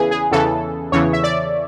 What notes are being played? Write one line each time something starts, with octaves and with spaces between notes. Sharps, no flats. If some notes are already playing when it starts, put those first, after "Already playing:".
Already playing: E2 C#3 E3 G#4 B4
G#4
E2 C#3 E3 A4
E2 C#3 E3 C#5
E5
D5